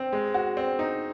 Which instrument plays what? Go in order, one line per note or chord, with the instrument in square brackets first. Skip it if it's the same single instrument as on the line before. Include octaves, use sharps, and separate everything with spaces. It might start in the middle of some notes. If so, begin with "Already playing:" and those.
Already playing: [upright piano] C4
G#3
F#4
C4
D#4